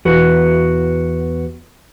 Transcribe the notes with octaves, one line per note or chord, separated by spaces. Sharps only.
E2 F#4 B4